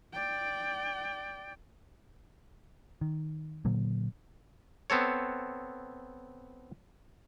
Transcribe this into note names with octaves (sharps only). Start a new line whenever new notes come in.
D5 G5
D#3
A#2 D3 F#3 A#3
B3 C4 A4 C#5